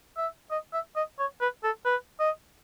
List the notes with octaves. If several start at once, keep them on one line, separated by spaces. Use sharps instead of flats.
E5
D#5
E5
D#5
C#5
B4
A4
B4
D#5